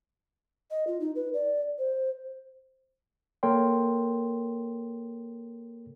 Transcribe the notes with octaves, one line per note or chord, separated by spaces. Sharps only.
D#5
F4
D#4
B4
D5
C5
A#3 A4 A#4 C#5 G5 C6